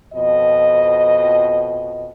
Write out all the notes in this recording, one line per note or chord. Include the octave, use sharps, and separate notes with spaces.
F2 B2 D#5